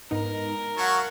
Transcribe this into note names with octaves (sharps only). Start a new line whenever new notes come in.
G#2 B3 D#4 A#4
F#3 F5 F#5 A5 C#6 E6 A#6